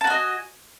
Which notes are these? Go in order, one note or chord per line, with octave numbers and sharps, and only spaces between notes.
F#4 D#5 G#5 A5